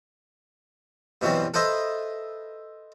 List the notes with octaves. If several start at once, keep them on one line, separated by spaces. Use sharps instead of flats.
G2 B2 E3 F#3 C4
A4 B4 C5 D#5 E5